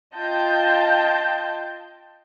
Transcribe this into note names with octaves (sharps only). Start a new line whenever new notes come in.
F4 D#5 G5 A5 G6